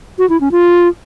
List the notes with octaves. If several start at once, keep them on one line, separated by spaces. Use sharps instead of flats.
F#4
E4
C#4
F4